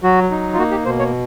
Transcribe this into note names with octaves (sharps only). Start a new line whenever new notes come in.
F#3 F#4
D#4
F4
A#3 F#4
G4
B2 C5
C#5